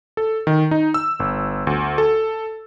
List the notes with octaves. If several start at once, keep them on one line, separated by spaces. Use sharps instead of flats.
A4
D#3
D#4
E6
G1
D2
A4